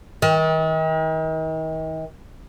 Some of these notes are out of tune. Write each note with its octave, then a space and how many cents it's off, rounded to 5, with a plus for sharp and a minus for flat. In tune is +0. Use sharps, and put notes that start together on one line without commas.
D#3 +40